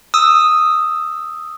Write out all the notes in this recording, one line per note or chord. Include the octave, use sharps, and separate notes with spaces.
D#6 E6